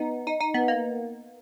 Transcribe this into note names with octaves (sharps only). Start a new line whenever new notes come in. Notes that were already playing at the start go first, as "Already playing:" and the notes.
Already playing: B3 D#4
D#4
D#4
B3
A#3